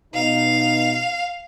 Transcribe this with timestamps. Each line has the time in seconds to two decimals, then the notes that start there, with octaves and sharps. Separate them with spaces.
0.14 B2 D#4 F5